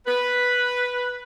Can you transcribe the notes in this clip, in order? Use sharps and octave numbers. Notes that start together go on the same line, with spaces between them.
B4